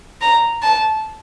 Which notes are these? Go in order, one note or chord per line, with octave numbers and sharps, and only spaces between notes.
A#5
A5